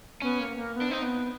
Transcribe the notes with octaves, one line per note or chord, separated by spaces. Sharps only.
B3 C#4
A#3
A#3
B3
D4
C4 D#4
B3